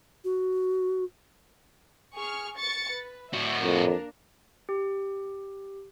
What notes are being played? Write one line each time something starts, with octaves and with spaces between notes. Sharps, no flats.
F#4
G#4 C#6 F6
C#6 A6 C#7
B4
A2 F#4 E5
F2 A#3 D4 A#4
G4